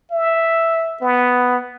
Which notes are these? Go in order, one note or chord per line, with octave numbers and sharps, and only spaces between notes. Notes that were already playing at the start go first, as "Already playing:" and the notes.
E5
B3